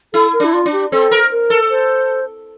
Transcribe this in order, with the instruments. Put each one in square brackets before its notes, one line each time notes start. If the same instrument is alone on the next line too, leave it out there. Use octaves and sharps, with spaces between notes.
[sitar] E4 [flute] A4
[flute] A#4
[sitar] D4 [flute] E4
[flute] F4
[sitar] D4
[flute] G4
[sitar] C4 [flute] A4
[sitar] A#4
[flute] A#4
[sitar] A4
[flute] C5